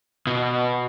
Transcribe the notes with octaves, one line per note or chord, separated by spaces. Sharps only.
B2